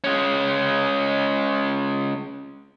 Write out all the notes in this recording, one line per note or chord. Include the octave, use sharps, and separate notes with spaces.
G#3 C#4